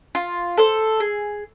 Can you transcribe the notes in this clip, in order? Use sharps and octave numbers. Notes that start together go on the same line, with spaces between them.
F4
A4 C5
G#4